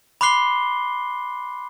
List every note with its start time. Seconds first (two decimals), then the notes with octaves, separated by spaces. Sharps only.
0.21 B5 C6 D6 F#6 C7 G7